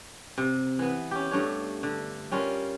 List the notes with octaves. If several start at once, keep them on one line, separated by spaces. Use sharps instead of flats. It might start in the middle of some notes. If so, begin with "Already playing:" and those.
C3
E3 B3
C#4 G4
G2 A3 D4 C#5
D3
G3 C#4 F4 A#4